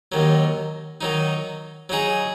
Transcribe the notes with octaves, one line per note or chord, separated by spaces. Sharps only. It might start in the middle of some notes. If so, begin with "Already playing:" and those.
D#2 D#3 F#3
D#3 F#3 D#4
F#3 D#4 G#4